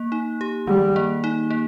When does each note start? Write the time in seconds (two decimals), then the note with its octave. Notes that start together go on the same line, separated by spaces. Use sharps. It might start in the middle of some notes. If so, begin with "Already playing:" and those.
Already playing: A#3
0.12 D#4
0.41 G4
0.67 D#3 G3
0.96 A#3
1.24 D#4
1.51 A#3